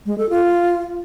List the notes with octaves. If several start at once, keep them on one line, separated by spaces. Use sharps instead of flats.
G#3
A4
F4